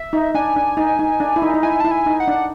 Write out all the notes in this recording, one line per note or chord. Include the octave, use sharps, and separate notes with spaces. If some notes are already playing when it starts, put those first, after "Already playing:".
Already playing: E5
D#4
D4 G#5
D4
D#4
D#4
D4
E4
D#4
D#4
E4 G#5
E4 A5
G#5
D#4
F#5
D4